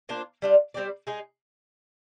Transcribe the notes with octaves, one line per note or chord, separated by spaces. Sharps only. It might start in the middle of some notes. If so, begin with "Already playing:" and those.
A#3 D4 F4 C5
G3 D4 F4
G3 C4 G4 D5
G#3 D#4 G#4